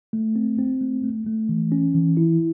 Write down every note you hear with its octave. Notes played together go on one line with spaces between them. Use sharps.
A3
C4
C4
A3
A3
A3
E3
C#4
E3
E4